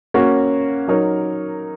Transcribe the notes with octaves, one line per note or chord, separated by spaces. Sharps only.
A#3 C#4 F#4 C#5
F#3 D#4 A#4 C#5